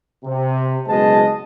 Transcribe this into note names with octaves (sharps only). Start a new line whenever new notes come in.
C3
F#1 B2 G#3 D#5 A5